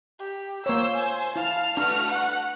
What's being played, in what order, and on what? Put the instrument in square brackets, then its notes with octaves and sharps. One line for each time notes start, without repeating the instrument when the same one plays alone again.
[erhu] G4
[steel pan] A#3 C#5 [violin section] C5 [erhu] E6
[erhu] G#5
[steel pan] E4 [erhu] F5 [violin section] A5 F6
[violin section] A3 F#4 B4 [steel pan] D4 [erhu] F6
[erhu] F#5